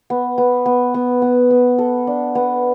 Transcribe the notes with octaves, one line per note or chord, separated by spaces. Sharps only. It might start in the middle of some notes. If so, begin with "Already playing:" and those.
B3
B3
B3
B3
B3
B3
A4
D4
B3